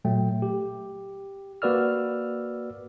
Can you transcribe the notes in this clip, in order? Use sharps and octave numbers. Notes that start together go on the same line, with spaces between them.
A#2 F#3 A3 G5
G4
A#3 F#4 B4 D5 E6 F6